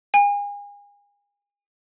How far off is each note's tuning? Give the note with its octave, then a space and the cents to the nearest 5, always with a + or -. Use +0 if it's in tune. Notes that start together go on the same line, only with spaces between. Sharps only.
G#5 -35